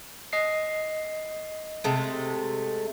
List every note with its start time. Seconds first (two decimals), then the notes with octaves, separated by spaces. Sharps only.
0.33 D#5 C7
1.84 C3 G#3 A3